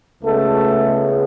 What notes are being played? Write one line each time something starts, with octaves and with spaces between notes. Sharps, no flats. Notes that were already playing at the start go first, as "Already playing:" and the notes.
C#2 C#3 G#3 A3 B3 A4